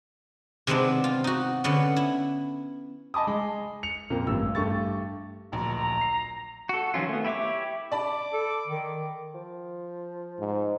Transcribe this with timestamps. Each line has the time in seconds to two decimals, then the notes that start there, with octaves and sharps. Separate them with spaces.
0.67 C3 D#3 G#3 B3 C4 D4
1.04 F4
1.24 D#4 F#4
1.64 D3 B3 C#4
1.96 E4
3.14 D#5 G#5 A5 B5 D6 D#6
3.27 G#3
3.83 C#7 F7
4.10 F2 A#2 A#3
4.27 A1 G2 E6
4.55 G2 A3 G4 C#6 A6
5.52 D1 A#1 A#5
5.74 A#5
6.01 C7
6.69 F#4 A4
6.94 D#3 F3 F#3 C#4 F4
7.09 A3 B3
7.24 E4 G4 C#5 E5 D6
7.92 D5 A5 B5 D6
8.33 A4
8.67 D#3
9.35 F3
10.39 G#2